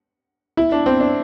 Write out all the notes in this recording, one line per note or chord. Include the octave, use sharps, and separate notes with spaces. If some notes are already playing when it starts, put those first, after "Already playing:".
E4
D4
C4
D4